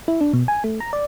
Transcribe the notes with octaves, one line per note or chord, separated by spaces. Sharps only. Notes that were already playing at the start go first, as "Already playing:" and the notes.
E4
D4
B2
G#5
A3
A#5
D5